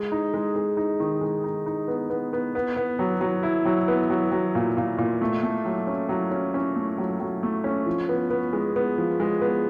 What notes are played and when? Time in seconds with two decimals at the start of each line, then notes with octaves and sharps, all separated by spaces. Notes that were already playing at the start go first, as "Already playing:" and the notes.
Already playing: G#3
0.12 D#4
0.34 G#3
0.56 G#3
0.77 D#4
1.00 D#3
1.21 G#3
1.44 D#4
1.66 D#4
1.88 B3
2.10 B3
2.33 B3
2.55 B3
2.76 B3
2.99 F#3
3.21 F#3
3.43 E4
3.65 F#3
3.88 B3
4.10 F#3
4.32 F#3
4.55 A#2
4.77 A#2
4.98 A#2
5.21 A3
5.43 A3
5.65 F#3
5.87 C#4
6.09 F#3
6.31 C#4
6.54 C#4
6.76 A3
6.98 F#3
7.20 F#3
7.43 A3
7.64 C#4
7.86 F3
8.09 B3
8.31 B3
8.53 G#3
8.76 B3
8.98 F3
9.20 G#3
9.41 B3